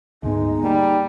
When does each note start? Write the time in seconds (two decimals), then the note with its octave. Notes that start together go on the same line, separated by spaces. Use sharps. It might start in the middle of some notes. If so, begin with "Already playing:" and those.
0.23 D2 G#2 G#3 B3 D#4
0.63 G3 A#3